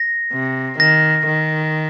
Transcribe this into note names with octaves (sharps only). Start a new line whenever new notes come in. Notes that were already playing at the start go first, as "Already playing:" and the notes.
Already playing: A#6
C3
D#3 A#6
D#3